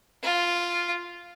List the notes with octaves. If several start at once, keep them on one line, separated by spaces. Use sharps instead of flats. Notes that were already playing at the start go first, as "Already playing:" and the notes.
F4